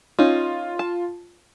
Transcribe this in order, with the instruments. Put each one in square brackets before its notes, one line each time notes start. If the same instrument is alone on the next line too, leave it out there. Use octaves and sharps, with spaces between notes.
[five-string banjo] C#4 D#4 [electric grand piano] F4
[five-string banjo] A5